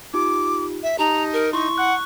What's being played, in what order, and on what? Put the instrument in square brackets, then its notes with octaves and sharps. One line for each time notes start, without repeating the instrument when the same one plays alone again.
[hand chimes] D#4 F4 G4 [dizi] D6
[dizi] E5
[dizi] D#4 [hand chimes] G4 A5 [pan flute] A#5
[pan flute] A#4
[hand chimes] E4 C6 [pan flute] C#6
[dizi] F#5 [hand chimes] F#6